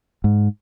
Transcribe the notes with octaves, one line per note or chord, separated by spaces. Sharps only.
G#2